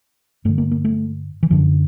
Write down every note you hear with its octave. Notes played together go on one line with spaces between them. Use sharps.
G2 D3 A3
A#3
A#3
A3
E3
F#2 D3 F3